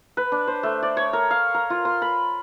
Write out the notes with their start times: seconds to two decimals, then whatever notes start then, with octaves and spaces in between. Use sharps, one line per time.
0.17 B4
0.32 D4
0.47 C5
0.63 A3
0.83 D5
0.97 C#5
1.13 A#4
1.31 F5
1.54 A#4
1.70 F4
1.85 C6
2.02 B5